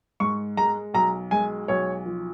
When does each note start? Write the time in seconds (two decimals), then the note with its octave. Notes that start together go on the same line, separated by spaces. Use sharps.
0.20 G#2 C#6
0.57 G#3 A#5
0.94 B1 A#5
1.31 G#3 G#5
1.68 B1 C#5
2.06 F3